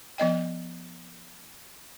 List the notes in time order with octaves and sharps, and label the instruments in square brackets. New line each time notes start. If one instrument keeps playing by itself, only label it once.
[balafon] F3 B3 D#5 G5